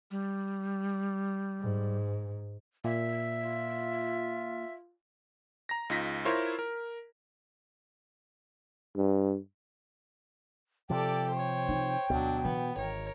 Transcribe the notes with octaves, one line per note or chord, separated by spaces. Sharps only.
G3
G#2
A#2 E5
F4
A#5 A#6
C#2 D#4 F4 A#6 B6
E4 F4 A#4 C5 C#5
A#4
G2
C3 F3 G4 A4 D5 G5
C5 C#5
D#4
D2 B2 F#3 D4
E3 B3
G#1 A#4 C#5